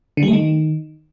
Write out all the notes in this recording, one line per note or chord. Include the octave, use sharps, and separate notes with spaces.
D3
G3
A3
D#3